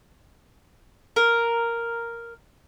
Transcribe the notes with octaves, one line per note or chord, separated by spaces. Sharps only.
A#4